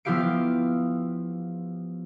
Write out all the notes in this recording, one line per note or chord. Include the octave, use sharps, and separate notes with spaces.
F3 B3 E4 G4 F5 D7